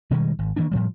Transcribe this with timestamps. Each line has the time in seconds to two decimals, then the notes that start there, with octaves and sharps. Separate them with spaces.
0.11 B2 D#3 G3 G#3
0.39 G#1
0.56 D#3 E3 A#3 D4
0.71 A2 F3 G3